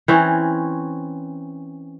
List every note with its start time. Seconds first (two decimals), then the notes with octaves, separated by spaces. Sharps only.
0.08 E3 C4 C#4